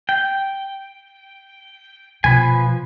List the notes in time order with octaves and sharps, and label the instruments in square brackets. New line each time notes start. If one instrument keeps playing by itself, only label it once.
[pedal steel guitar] G5
[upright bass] B2 [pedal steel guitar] F3 B4 G#5